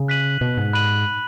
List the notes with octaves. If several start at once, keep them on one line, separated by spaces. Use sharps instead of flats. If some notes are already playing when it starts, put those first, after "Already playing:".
Already playing: C#3
F#6 B6 D#7 F#7
B2
G#2
B5 F#6 D#7 F#7